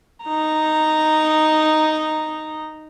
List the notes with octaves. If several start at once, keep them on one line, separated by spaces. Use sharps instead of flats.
D#4 A#5